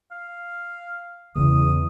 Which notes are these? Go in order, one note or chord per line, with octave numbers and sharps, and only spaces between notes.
F5
E2 C#3 C#4 D#6